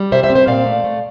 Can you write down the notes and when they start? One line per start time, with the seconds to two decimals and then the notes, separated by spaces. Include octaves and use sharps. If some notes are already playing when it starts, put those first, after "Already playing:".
Already playing: G3
0.12 C3 C5 E5
0.23 C5 E5
0.30 C4
0.35 C5 E5
0.47 A#2 D5 F5
0.66 A3
0.84 A3